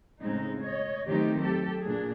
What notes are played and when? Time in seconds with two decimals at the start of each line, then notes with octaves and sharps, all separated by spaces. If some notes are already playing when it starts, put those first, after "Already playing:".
0.20 A2 C#3 G#3 C4 D#4
0.61 C#5 D#5
1.08 D#3 F#3 A3 C4 D#4 G4
1.40 F#3 A3 G4 A4
1.83 A#2 D4 G#4